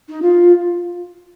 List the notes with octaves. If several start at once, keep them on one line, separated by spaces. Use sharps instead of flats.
D#4
F4